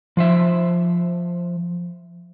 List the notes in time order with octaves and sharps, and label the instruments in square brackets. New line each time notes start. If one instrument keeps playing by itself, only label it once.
[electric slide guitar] F3 C5 E5